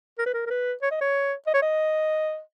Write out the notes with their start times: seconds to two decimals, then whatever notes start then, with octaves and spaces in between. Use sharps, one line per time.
0.19 A#4
0.26 B4
0.34 A#4
0.46 A#4
0.50 B4
0.82 C#5
0.92 D#5
1.01 C#5
1.47 D#5
1.54 C#5
1.62 D#5